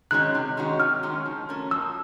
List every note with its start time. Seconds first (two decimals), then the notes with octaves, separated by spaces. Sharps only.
0.11 D#3 G#3 C#4 F#4 F#6
0.35 C3
0.57 D#3 G#3 C#4 F#4
0.80 C3 F6
1.03 D#3 G#3 C#4 F#4
1.26 F3
1.49 A3 C#4 F#4 A#4
1.71 F3 E6